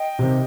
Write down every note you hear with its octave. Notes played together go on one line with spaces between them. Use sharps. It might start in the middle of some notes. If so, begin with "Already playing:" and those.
Already playing: D#5 G5
C3 D#3